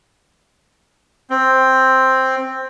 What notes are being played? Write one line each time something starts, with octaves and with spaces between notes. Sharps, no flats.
C4